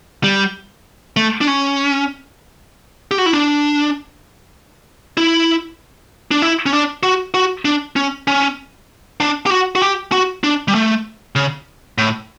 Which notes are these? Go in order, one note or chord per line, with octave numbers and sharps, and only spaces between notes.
G3
A3
D4
C#4
G4
F#4
E4
D4
E4
D4
E4
C#4
D4
F#4
F#4
D4
C#4
C#4
D4
G4
F#4
F#4
G4
F#4
D4
G3
A3
C#3
A2